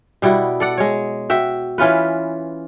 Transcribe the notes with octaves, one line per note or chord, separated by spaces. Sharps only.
B2 G3 E4 F#4
A4 D5 F#5
G#3 C#5
F#4 E5 G5
E3 C#4 F4 B4